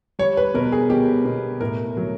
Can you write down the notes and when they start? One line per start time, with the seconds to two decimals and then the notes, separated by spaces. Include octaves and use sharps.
0.19 G3 C#5
0.37 B4
0.54 B2 A#4
0.72 G#4
0.90 B2 G4
1.25 B2
1.61 A2 A#4
1.97 F#3